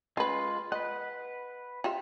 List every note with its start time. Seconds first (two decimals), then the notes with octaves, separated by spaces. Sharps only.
0.17 G#3 C#4 F4 B4
0.72 B4 D#5 F#5
1.84 F4 G4 E5